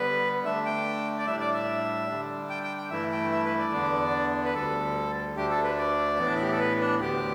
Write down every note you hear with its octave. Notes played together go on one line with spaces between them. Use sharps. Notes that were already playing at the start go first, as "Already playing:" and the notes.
Already playing: D3 G3 B3 B4
D3 A3 D4 E5
G5
D5
A2 G3 D4 E5
D5
E5
D3 G3 D4
G5
G5
G5
G2 E3 A3 E4 E5
G5
E5
B4
D5
E2 D3 B3 D4
B4
D2 D3 G3 A4
D2 D3 A3 D4 G4
A4
B4
D5
A2 E3 B3
D4
E4
G4
A4
B4
D4
D2 D3 B3 G4